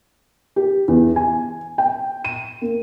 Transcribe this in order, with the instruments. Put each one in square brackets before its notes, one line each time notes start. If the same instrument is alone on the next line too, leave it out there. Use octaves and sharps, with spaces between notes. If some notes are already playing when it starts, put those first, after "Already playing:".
[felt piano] G4
E2
G#5
G5
D#7
A#3